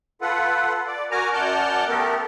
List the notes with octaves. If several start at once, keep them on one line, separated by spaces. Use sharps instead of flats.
F4 A4 B4 F#5
D5
F#4 A#4 G#5 A#5 D6 F6
F#2 D5 F#5 A5 F6 G6
A3 B3 G4 A4 A#4